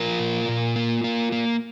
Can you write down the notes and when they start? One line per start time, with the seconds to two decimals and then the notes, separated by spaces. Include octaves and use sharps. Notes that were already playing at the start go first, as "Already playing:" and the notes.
Already playing: F3 F4 A#4
0.19 A#2
0.49 A#2
0.76 A#3
1.04 A#3
1.32 A#3